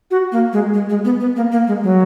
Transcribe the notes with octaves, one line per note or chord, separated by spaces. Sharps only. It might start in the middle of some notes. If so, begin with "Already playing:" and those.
F#4
A#3
G#3
G#3
G#3
B3
B3
A#3
A#3
G#3
F#3